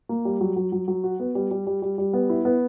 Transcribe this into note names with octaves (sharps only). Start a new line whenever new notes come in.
A#3
G3
F#3
F#3
F#3
F#3
F#4
B3
G3
G3
G3
G3
G3
B3
E4
B3